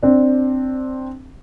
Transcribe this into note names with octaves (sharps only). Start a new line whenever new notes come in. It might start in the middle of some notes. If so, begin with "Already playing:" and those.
C4 D4